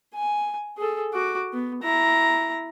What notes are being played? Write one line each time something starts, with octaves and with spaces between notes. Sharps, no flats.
G#5
G#4 A4
F#4 D6
B3
E4 A#5